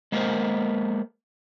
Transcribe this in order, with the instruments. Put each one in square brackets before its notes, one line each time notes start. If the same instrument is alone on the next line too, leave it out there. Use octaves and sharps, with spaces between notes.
[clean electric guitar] G#3 A#3 B3 A4 A#4 C5